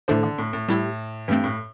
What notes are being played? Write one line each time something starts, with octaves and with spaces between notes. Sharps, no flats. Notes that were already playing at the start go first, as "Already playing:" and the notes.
A2 D3 A3 D4 A4 C5
D3
A2
A2
A2 G3 E4 G4
G2 E3 A3 C4
A2